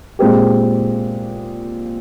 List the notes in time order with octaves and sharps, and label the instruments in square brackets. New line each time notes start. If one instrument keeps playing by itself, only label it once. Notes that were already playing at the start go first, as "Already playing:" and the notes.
[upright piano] A#2 G#3 C4 G4